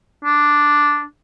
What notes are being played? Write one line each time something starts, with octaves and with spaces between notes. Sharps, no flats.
D4